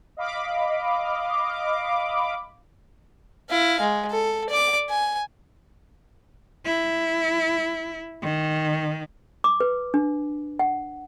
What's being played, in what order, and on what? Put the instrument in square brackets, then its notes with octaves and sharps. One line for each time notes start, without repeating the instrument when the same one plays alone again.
[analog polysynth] D#5 F5 B5 D6
[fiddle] E4 F5
G#3
A4
D5 D6
G#5
[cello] E4
D#3
[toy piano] D6
B4
D4
F#5